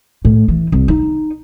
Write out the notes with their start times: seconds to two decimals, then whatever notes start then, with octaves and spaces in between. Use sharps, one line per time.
0.25 A2
0.48 E3
0.72 C2
0.88 D#4